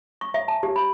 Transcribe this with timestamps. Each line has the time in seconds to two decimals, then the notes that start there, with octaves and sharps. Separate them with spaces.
0.21 C#6
0.34 E5
0.48 A5
0.63 G4
0.76 B5